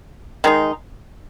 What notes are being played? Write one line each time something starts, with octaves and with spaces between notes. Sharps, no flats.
D#3 G#3 D#4